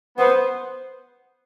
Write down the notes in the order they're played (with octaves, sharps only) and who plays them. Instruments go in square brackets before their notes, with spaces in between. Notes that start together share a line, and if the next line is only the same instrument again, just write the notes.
[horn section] B3 [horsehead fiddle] C5